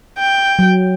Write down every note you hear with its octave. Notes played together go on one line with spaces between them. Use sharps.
G5
F#3